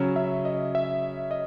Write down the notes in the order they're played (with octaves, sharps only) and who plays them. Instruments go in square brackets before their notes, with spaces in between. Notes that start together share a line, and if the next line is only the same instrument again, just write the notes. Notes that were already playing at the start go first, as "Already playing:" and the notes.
Already playing: [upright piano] C#3 F#3 C#4
[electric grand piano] E5
D#5
E5
D#5